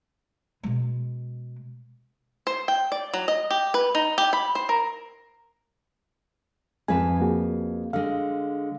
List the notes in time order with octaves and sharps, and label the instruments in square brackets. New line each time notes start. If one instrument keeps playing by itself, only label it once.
[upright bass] B2 G#3
[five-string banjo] C5
G5
D5
F#3
D#5
G4
B4
D#4
G4
B5
C5
A#4
[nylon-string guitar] F2 B4 A5 [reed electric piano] G#2 G#3 G#5
[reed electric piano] A#3 F#4 G#4
[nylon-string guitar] D3 G#3 [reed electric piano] F5